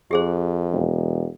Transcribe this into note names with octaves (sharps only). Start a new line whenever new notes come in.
F2 G4 G#4 C5
E1